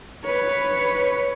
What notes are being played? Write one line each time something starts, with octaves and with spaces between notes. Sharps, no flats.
B4 C#5